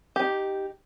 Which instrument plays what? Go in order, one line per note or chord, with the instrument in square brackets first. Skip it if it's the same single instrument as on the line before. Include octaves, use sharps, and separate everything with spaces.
[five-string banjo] D#4 G4